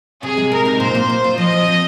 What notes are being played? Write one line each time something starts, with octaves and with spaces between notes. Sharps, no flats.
C3 G#4
G#3
C3 A#4
D#4
A#2 C5
A#3
A#2
F4
F3 D#5
C4
F3